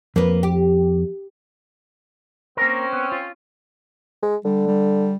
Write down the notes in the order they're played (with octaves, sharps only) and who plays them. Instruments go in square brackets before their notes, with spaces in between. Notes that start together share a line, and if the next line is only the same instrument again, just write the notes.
[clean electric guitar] F2 [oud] A#3 B4
[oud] G4
[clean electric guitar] A#3 A#4 [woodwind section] C4 C#4
[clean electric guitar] B3
F4
[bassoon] G#3
[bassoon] D3 [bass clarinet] G3
[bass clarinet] G3